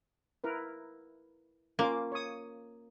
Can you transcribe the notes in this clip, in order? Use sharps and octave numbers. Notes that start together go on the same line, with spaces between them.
E4 A#4 B4
A#3 C#4 F4 D6
C#5 D#6